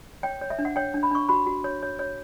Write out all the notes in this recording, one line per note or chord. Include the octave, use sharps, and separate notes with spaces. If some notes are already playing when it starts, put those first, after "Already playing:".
C#5 G5
C#5
E5
D4
F#5
C#5 G5
D4
B5
D4 C#6
F#4 B5
F#4
C#5
C#5
C#5